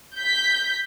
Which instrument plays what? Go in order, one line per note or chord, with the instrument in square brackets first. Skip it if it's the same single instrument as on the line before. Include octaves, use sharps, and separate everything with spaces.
[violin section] G6 B6